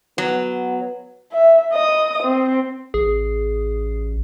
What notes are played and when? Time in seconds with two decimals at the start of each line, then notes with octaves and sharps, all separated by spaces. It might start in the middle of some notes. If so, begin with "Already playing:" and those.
0.18 F#3 B3
1.32 E5
1.72 D#5 D#6
2.23 C4
2.94 A1 G#4